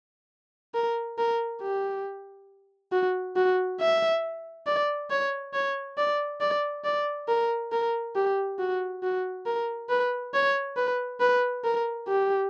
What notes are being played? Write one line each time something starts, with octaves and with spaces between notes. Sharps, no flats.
A#4
A#4
G4
F#4
F#4
E5
D5
C#5
C#5
D5
D5
D5
A#4
A#4
G4
F#4
F#4
A#4
B4
C#5
B4
B4
A#4
G4